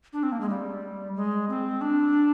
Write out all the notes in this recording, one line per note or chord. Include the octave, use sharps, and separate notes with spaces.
D4
C4
A#3
G#3
G3
G#3
C4
D4